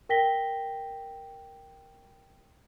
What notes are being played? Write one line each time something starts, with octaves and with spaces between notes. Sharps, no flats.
A#4 G5 A#6 B6 G7